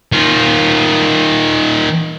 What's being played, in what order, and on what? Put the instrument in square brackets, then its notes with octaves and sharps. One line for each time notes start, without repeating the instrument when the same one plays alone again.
[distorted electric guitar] D#3 F4